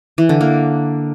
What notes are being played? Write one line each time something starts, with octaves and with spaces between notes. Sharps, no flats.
E3
D3
A#3